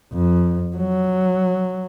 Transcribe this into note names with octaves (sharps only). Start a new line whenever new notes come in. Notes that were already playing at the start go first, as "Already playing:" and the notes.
F2
F#3